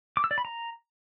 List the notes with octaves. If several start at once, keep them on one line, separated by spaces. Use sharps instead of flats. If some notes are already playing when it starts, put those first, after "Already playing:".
D6
E6
D5
B5
A#5